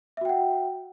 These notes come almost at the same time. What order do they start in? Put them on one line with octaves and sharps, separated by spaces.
E5 F#4 G5 F#5